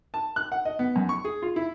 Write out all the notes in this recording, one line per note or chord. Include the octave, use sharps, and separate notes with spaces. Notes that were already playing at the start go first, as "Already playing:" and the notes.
A5
F#6
F#5
D#5
B3
F#2
C#6
G#4
F4
E4